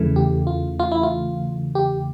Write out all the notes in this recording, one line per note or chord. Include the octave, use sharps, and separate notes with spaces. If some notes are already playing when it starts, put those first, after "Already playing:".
Already playing: E2 C#3 E3 A3
G4
F4
F4
E4
F4
G4